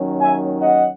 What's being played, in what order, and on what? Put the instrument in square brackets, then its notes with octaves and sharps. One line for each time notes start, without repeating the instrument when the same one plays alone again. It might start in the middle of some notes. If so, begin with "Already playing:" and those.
Already playing: [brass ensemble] D#2 D#3 F#3 C#4
E5 G#5
D#5 F#5